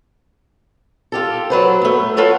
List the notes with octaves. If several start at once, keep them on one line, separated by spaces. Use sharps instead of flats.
F4 G4 A4
F#3 B4 C5
A3 B3
B3 F4 A4 B4 C#5